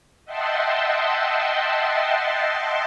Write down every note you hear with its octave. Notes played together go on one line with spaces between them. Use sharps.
D#5 E5 F#5 G5 A5 C6